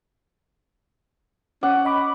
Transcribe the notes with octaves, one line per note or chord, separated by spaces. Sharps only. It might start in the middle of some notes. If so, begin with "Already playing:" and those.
C#4 F#5 D6
D#5 B5 D6